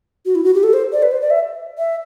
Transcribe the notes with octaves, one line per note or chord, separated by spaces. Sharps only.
F#4
E4
F#4
G4
A4
C5
D5
B4
C5
D5
E5
E5